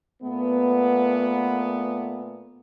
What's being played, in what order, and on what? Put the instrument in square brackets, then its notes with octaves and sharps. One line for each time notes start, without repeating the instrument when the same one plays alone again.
[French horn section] A#2 A3 B3